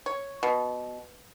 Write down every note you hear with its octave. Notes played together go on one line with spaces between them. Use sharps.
C#5
B2